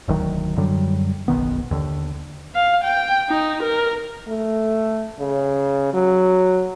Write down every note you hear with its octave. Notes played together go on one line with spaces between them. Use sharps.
E1 D2 D#3 F#3
F#2 D3 F#3 G3
F#1 B1 D#3 B3
D#2 D3
F5
G5
D#4
A#4
A3
C#3
F#3